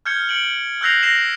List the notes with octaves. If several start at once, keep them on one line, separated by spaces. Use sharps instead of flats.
F6 G6 G#6 C#7 G7
C#7 D7 F#7
E6 F#6 G6 A#6 C7 F7
A#6 C7 E7 F7